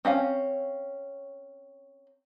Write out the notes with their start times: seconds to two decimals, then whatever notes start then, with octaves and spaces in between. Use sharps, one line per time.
0.05 C4 C#4 F5 G#5